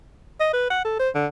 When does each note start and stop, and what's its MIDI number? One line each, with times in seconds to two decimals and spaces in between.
0.40 0.51 75
0.53 0.66 71
0.70 0.81 78
0.85 0.96 69
0.99 1.09 72
1.15 1.27 50